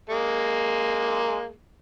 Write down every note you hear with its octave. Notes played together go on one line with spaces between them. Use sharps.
G#3 A#3